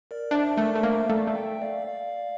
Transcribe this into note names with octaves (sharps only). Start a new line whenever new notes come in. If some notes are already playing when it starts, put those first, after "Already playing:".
A#4 D5
D4 C5 E5
A3 A#4 D5
A3
A#3 C5 E5
A3 D5 F5
A3
E5 G5
D5 F5
D5 F5